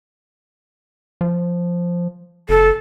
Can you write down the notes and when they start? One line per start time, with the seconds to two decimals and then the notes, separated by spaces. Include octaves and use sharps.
1.21 F3
2.49 F#1 A4